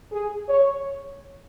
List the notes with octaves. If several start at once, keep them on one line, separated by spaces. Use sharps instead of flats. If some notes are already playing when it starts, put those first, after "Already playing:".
G#4
C#5